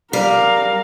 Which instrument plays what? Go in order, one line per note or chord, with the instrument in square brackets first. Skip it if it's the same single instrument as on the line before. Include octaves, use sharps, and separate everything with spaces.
[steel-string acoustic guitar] G3 [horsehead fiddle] A#4 F5